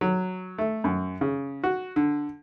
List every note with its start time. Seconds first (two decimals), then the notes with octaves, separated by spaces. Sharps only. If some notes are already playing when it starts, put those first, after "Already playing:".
0.01 F#3
0.58 A3
0.84 F#2
1.21 C#3
1.64 F#4
1.96 D3